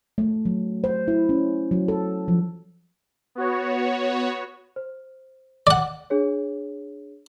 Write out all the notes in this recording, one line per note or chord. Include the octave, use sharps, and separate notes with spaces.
A3
F#3
C5
E4
C#4
F#3
A4
F3
B3 F#4 C#5
C5
D5 F#5
D4 G#4 C#5